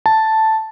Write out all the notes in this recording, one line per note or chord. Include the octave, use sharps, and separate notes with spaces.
A5